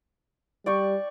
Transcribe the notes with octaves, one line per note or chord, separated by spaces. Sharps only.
G3 D5 G5 C#6